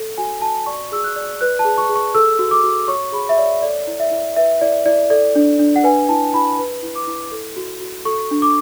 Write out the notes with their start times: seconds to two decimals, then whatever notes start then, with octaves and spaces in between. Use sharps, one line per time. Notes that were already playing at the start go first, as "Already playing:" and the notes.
Already playing: A4
0.18 F#4 G#5
0.42 F#4 A5
0.66 D5 C#6
0.92 G#4 E6
1.04 F#6
1.16 D5
1.41 B4 F#6
1.59 A5
1.65 G#4
1.78 C#6
1.89 G#4
1.96 C#6
2.14 A4 E6
2.39 F#4
2.51 D6
2.64 F#4
2.88 C#5 C#6
3.13 G#4 B5
3.29 E5
3.38 C#5 D5
3.62 A4 D5
3.87 E4
4.00 E5
4.11 E4
4.36 B4 E5
4.61 E4 D5
4.86 E4 D5
5.10 A4 D5
5.35 D4
5.59 D4
5.76 F#5
5.84 B4 G#5
6.09 E4 A5
6.33 E4 B5
6.59 B4
6.83 E4
6.96 D6
7.07 E4
7.32 A4
7.57 F#4
7.81 F#4
8.05 A4 C#6
8.31 D4
8.42 D6